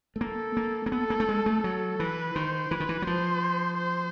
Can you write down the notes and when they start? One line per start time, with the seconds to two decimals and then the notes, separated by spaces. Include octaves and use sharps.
0.16 A3
0.21 A#3 A4
0.57 A#3
0.86 A#3
0.92 B3 A4
1.10 A#3
1.20 A3
1.29 G#3
1.46 A3
1.64 F#3 A4
1.99 E3 B4
2.35 D#3 C5
2.71 E3 B4
2.80 D#3
2.89 E3
3.02 F#3
3.06 F3 C5
3.78 C5